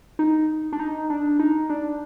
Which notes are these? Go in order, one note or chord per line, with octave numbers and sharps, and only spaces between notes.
D#4
D4
D#4
D4
D#4
D4